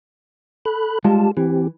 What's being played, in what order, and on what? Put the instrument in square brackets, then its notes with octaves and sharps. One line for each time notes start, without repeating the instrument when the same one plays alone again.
[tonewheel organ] A4 B5 F#6
[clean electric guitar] G3 G#3 F4 [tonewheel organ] G4 A5
[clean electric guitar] E3 [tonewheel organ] C4 G4